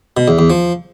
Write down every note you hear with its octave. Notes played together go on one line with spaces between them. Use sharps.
B2
E2
E2
F3